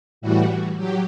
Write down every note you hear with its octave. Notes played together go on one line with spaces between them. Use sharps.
A2 E3 G3 F#4
F#3 G4